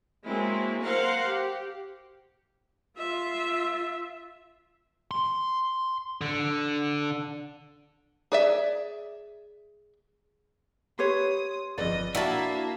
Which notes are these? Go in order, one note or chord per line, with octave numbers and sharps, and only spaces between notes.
F#3 G#3 A#3 C4 E4
A#4 C5 F5 F#5
G4
F4 E5
C6
D3
G#4 D5 E5
G4 B4 C#5 C6 D#6
G1 F2 G#4 B4 D5 D#5
A#3 D4 E4 F#4 A#4 E5 A5